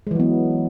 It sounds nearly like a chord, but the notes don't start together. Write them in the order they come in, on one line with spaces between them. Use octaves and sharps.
G#3 E3 F#3 B3